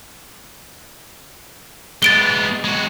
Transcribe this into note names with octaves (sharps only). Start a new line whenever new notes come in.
G#3 B3 A6 D7 G7
G#3 F#4